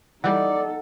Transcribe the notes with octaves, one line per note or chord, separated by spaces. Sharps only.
E3 G3 D#4 A4 D5 F#5